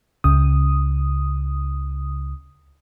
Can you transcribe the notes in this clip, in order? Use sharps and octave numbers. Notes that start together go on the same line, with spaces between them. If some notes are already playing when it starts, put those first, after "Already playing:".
C#2 C#3 D#6